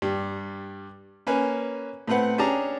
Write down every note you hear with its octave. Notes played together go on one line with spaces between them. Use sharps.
G2 G3
A#3 C#4 B4 G#5
A2 B3 C4 B4 F#5
C#4 D4 G4 G#4 A5 A#5